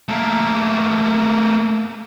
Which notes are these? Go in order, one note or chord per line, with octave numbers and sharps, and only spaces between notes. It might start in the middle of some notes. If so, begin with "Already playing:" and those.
A3 A#3